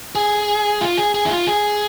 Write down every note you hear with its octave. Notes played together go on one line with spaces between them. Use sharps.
G#4
F4
G#4
G#4
E4
F4
G#4